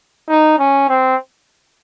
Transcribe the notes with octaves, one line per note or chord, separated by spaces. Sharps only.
D#4
C#4
C4